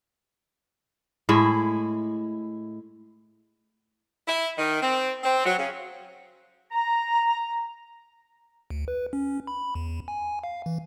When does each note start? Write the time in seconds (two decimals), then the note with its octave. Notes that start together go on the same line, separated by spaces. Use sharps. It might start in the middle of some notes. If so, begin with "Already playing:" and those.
1.29 A2 G#3 E4
4.28 E4
4.58 D#3
4.82 C4
5.23 C4
5.45 F#3
5.58 C#3
6.72 A#5
8.70 D2
8.88 B4
9.13 C#4
9.47 B5
9.75 E2
10.08 G#5
10.44 F5
10.66 E3